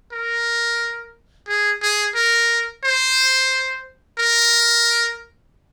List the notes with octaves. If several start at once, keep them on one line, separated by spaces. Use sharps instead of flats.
A#4
G#4
G#4
A#4
C5
A#4